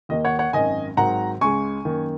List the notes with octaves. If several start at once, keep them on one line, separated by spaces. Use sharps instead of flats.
D#2 D#3 A#3 D#5
C#5 F#5
C#5 F#5
G#1 F#2 D#3 D#5 G#5
G#1 G#2 D#3 F#3 F#5 A#5
C#2 C#3 G#3 G#5 C#6
F#2 D#3 A#3